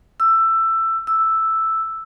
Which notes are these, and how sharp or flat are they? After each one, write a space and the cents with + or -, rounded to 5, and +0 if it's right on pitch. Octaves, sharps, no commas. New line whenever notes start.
E6 +15
E6 +0